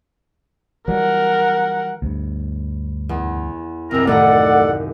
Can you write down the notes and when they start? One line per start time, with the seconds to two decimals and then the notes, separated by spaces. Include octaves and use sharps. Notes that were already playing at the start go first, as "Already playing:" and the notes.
0.88 E3 F#3 G3 A#4 F#5
2.02 D2 G2
3.09 E2
3.91 C2 F#2 C4 A#4
4.07 D#2 A2 A3 A4 D5 F#5 A#5